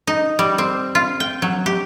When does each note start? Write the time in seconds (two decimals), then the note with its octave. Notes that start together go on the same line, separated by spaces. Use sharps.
0.07 D#4
0.39 G3
0.58 C4
0.95 F4
1.20 G5
1.42 F#3
1.66 G4